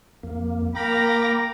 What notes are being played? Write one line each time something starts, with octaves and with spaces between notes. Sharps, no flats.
F2 A#3
A#3 A#4 G5 A#5 B5 D6 A#6